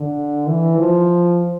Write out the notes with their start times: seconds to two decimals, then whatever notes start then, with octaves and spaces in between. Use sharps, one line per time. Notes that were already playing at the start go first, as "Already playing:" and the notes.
Already playing: D3
0.47 E3
0.78 F3